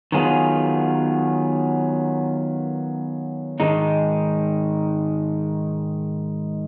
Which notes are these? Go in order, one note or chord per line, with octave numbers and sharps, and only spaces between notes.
D#3 F#3 B3 F4 G#4
G#2 D#3 G#3 D#4